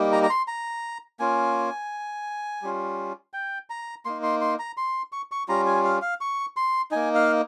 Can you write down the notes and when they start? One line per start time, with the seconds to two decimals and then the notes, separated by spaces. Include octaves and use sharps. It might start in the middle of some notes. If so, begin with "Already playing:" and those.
Already playing: G3 A#3 D#4
0.12 A#5
0.23 A#5
0.30 C6
0.48 A#5
1.20 A#3 C#4 F4 G#5
2.62 G3 C#4 F4
3.34 G5
3.70 A#5
4.05 A#3 D#4 C6
4.23 C6
4.41 C6
4.59 A#5
4.77 C6
5.12 C#6
5.32 C#6
5.48 G3 C#4 F4 A#5
5.66 G#5
5.84 F5
6.02 F5
6.21 C#6
6.57 C6
6.91 A#3 D#4 G#5
7.15 F5